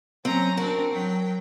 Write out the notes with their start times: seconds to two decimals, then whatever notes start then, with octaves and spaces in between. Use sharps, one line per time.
0.25 F#3 C4 C#4 A#5
0.57 C4 D4 F#4 A#4
0.92 F#3 G5